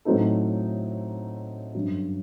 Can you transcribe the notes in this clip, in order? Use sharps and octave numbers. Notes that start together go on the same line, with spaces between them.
A2 F#3 C4 D#4 A4
G1 F#2 F#3